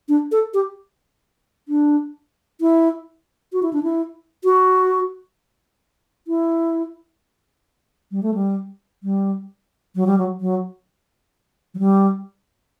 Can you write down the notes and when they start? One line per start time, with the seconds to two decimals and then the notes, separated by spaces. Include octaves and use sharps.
0.09 D4
0.32 A4
0.54 G4
1.69 D4
2.61 E4
3.53 F#4
3.63 E4
3.73 D4
3.83 E4
4.44 F#4
6.28 E4
8.11 G3
8.23 A3
8.34 G3
9.03 G3
9.95 F#3
10.07 G3
10.18 F#3
10.41 F#3
11.74 F#3
11.79 G3